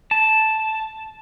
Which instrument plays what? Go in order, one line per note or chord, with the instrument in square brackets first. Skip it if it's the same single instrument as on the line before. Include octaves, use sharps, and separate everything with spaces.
[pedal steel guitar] A5